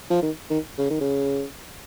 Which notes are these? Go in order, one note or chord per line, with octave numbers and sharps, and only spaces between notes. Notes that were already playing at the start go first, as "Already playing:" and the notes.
F3
D#3
D#3
C#3
D#3
C#3